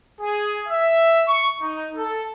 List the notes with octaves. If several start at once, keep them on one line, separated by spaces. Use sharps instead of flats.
G#4
E5
C#6
D#4
A4